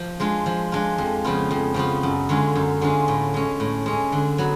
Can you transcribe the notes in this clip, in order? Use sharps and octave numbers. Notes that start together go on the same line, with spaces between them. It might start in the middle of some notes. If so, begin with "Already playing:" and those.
Already playing: F3
G#3 D4 F4
F3
G#3 D4 F4
F2
C#3 F3 B3 F4
F2
C#3 F3 B3 F4
F#2
D3 G#3 C#4 F4
F#2
D3 G#3 C#4 F4
A2
G#3 C#4
A2
G#3 C#4
D3
F#3 B3